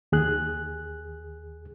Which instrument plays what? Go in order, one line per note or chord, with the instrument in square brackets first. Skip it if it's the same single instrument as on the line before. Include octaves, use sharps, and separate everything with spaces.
[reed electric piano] D#2 G#4 F#6